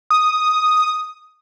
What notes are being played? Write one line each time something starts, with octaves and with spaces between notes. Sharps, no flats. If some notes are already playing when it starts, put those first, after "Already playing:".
D#6